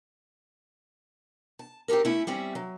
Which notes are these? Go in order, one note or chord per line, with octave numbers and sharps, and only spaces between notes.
A5
C4 D#4 G4 A4 A#4
A3 C#4 E4
G3 C4 C#4 E5
F#3